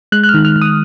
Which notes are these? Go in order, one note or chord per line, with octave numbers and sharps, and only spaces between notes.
G#3 F#6
F#6
F6
D#3
F6
D#3
D#6